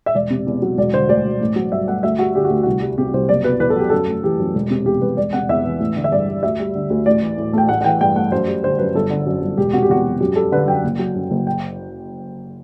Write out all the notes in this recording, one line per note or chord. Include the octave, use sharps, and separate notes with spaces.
E5
E1 D5
C3
E2
F#3
E1 D5
D3 C5
D2 D5
E1
A1
F#3
G2 E5
A3 F#5
D2 E5
G3 F#4
D3 G4
F#4
D2
C2 F#4
G3
C3 G4
C2 C5
F#1 D5
B2 B4
E2 B4
A4
F#3 G4
F#2 A4
A3
E3 G4
F#2
E1
C3
E2 G4
E1 B4
E1 D5
C3 F#5
E2 E5
E3
A1
D3
E5
G2 D5
G3
D2 E5
G3
D3
D2
A1 D5
E3
A2
A3 G5
A1 F#5
F#5
E3 G5
G2 G5
A3 F#5
F#2 C5
G3
D3 C5
F#2 B4
G1 A4
D3
F#2
G1
E1 G4
C3 F#4
G4
E2 F#4
F#3
F#2 G4
G3 A4
D3 B4
F#2 G5
F#1
F#3
F#2
F#1
G5